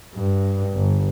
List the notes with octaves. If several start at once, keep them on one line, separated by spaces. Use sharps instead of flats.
G2
G1